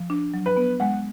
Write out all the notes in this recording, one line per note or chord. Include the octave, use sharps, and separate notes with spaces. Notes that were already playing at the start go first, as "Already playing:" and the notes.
Already playing: F3
D4
F#3
B4
B3
G#3 F#5